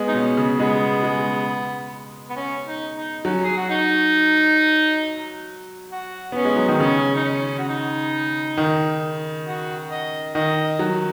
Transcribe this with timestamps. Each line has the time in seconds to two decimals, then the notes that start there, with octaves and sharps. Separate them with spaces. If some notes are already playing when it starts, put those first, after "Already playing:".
Already playing: G#3 B3
0.08 D#4
0.14 B2 C#4
0.37 C#3
0.59 G#3 B3
1.03 G#3
2.30 B3
2.36 C#4
2.66 D#4
2.96 D#4
3.25 F#3 C#4
3.44 G#4
3.57 F#4
3.70 D#4
5.92 F#4
6.32 B3 C#4
6.45 G#3
6.56 F#3
6.69 D#3
6.80 C#3 C#4
7.15 D#4
7.25 C#4
7.58 F#4
7.69 D#4
8.57 D#3
9.47 F#4
9.91 D#5
10.35 D#3 D#5
10.79 F#3